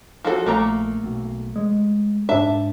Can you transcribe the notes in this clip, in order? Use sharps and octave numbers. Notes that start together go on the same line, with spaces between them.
F3 F#4 A4
A#1 A3 A#3 A#5
B1
G#3
G#2 D4 E5 A5